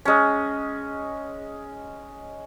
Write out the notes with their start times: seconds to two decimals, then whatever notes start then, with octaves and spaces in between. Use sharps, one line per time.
0.05 G#3 C#4